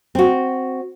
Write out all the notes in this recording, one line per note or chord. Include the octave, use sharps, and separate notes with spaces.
C4 F#4